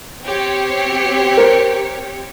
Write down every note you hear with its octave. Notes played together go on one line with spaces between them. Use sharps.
C4 G4 C#5
A#4 C5